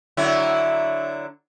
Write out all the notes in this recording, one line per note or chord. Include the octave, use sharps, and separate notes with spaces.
D3 F#3 E4